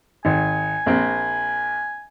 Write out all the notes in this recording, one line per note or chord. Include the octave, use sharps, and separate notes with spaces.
G#1 G#5
A#1 C4